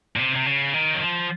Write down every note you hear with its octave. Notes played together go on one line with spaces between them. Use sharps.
A#2
C3
C3
C#3
D#3
F#3
F3